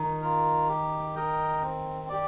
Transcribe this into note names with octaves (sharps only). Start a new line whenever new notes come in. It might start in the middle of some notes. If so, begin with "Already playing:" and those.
Already playing: D#3
F4 A#4
G4
A#4 D#5 G5
C4
G4 D5